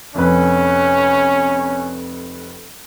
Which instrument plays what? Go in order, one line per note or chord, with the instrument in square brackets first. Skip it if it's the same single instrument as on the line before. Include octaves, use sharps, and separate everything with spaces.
[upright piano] F1 F2 B4 [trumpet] C#4